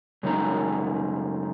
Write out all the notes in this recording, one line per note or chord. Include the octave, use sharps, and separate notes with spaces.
F#2 C#3 G#3 D#4